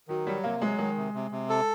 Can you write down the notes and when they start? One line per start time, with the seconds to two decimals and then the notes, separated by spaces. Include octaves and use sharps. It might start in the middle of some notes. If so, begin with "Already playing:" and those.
0.08 D#3 F#3
0.26 F#3 G3
0.44 C3 A#3
0.61 F#3 G#3
0.78 D#3 G#3
0.97 C3
1.14 C3
1.31 C3
1.49 A4